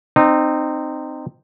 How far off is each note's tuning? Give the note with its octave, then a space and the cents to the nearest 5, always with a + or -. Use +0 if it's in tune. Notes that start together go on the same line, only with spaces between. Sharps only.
C4 -5 D#4 -25